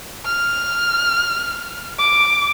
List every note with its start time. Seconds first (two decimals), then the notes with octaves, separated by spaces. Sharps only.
0.25 F6
1.98 D6